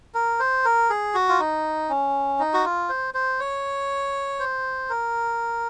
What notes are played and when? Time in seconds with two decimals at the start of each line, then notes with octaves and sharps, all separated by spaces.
0.14 A#4
0.40 C5
0.65 A#4
0.90 G#4
1.15 F#4
1.29 F4
1.39 D#4
1.90 C#4
2.39 D#4
2.54 F#4
2.65 F4
2.89 C5
3.14 C5
3.40 C#5
4.39 C5
4.90 A#4